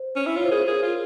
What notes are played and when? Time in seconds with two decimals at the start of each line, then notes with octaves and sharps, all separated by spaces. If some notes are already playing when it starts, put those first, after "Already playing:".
Already playing: C5
0.16 C#4
0.26 E4
0.36 F4 C#5
0.44 C5
0.50 G#4 A#4
0.58 C5
0.67 G#4 A#4
0.83 F4